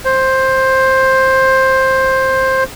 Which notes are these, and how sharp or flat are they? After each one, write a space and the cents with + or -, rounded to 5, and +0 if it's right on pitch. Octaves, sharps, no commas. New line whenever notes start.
C5 +10